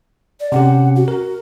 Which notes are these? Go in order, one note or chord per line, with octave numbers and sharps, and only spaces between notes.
D5
C3 C#4 G4 F#5
F#4
A#4